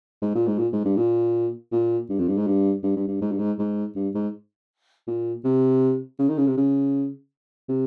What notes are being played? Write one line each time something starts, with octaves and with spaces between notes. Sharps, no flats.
G#2
A#2
G#2
A#2
G#2
G2
A#2
A#2
G2
F2
G2
G#2
G2
G2
G2
G2
G#2
G2
G#2
G#2
G2
G#2
A#2
C3
C#3
D#3
C#3
C3
C#3
C3